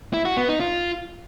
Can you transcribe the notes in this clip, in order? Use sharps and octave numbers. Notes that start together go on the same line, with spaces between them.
E4
F#4
B3
D#4
F4